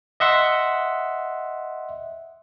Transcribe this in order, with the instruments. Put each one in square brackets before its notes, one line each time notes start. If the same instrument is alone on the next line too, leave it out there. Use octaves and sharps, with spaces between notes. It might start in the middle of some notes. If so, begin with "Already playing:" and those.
[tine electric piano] D#5 E5 F#5 C6